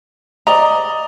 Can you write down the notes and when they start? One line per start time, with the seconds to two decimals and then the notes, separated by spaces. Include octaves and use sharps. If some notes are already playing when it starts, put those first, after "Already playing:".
0.47 D5 D#5 A#5